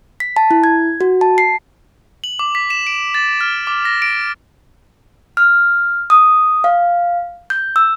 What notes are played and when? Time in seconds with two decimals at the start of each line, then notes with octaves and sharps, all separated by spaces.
0.20 B6
0.36 A5
0.51 E4
0.64 G#6
1.01 F#4
1.21 A5
1.38 C7
2.24 F#7
2.39 D6
2.55 B6
2.70 E7
2.87 D7
3.14 A6
3.41 F6
3.67 D6
3.85 A#6
4.02 D7
5.37 F6
6.10 D#6
6.64 F5
7.50 G6
7.76 E6